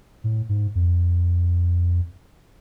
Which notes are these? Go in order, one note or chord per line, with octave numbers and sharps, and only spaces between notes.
A2
G#2
F2